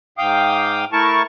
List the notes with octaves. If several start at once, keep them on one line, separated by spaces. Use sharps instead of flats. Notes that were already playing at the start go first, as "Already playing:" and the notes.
G#2 F5 G5 D6 D#6
A3 E4 A#4 A5 C#6